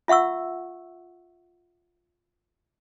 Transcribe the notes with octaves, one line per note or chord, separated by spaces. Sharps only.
F4 E5 F#5 C#6 E6